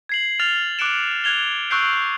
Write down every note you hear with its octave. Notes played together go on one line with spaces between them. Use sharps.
G#6 C7 F#7
F6 A6 F7
D6 F#6 C#7 D7 E7
F#6 G#6 F7 G7
C#6 E6 F#6 G6 C7 D7